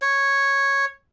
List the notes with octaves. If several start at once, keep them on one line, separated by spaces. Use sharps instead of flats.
C#5